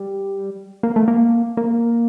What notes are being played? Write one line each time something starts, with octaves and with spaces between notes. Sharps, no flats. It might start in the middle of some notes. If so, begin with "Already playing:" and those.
Already playing: G3
A#3
A3
A#3
A#3